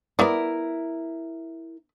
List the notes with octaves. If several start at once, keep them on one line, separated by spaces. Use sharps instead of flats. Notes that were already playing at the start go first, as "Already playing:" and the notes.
B3 E4 A#4 D5